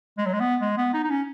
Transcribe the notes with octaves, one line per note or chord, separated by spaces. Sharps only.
G#3
F#3
G#3
B3
G#3
B3
D#4
D#4
C#4